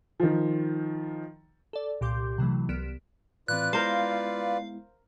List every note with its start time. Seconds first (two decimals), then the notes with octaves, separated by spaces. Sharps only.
0.20 D#3 F3
1.73 A4 D5
2.01 C2 A#2 G4 C6 D6 G6
2.38 C3 E3 F#3 A3
2.69 C2 B3 F6 B6 D7 E7
3.48 A2 E3 C4 F4 B4 D5 F#6
3.73 G#3 B3 E4 A#4 C5 F5